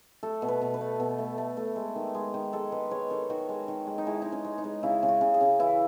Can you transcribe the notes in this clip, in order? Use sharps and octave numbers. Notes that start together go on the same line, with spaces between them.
A3 A4
B2
B4
B2
B4
A3
B2
A3
A3
A3
G#3
D#3
G#3
D#3
G#3 A4
G#3 B4
G#3 C#5
D#3 A4
D#3 F#4
G#3
D#3
G#3
D#4
G#3 E4
G#3 D#4
C#4
G#3
D#4
G#3
C#3 E4
C#3
F#4
C#3
G#4
C#3
E3 E4